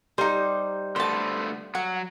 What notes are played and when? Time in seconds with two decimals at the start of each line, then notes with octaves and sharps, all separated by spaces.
0.18 G3 D#4 C5
0.96 D3 A3 B3 C5 A5
1.75 F#3 F#5